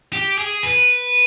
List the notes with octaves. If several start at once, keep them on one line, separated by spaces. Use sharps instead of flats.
G4
G#4
B4